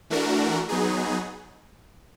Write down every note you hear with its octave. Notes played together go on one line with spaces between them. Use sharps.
E3 A3 D4 F#4 A#4
F#3 B3 D#4 G#4